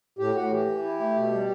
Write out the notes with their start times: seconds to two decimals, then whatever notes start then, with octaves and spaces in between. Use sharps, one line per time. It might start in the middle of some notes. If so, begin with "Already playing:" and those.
0.19 A2 G4
0.35 A2 F#4
0.51 E3 G4
0.67 E3
0.84 E4
1.00 A3
1.16 B2
1.32 G3